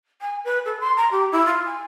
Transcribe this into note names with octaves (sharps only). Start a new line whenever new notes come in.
G#5
B4
A4
C6
A#5
G4
E4
F4
G#5